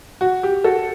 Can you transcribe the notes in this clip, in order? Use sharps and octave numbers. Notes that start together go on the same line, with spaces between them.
F#4
G4
F#4 A4